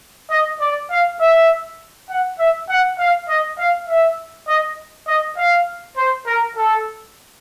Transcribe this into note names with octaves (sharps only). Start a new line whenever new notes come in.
D#5
D5
F5
E5
F#5
E5
F#5
F5
D#5
F5
E5
D#5
D#5
F5
C5
A#4
A4